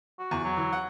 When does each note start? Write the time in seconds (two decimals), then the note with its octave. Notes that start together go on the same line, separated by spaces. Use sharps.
0.19 F#4
0.31 E2
0.44 F#3
0.57 E3
0.73 F#5